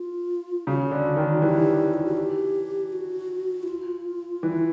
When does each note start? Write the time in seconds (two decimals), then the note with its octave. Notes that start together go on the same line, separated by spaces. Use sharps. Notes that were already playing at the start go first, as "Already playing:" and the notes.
Already playing: F4
0.67 C#3 F#4
0.91 D3
1.16 D#3
1.42 E3 G4
1.94 F4
2.05 F#4
2.17 G4
2.93 F#4
3.63 E4
3.68 F4
4.43 E3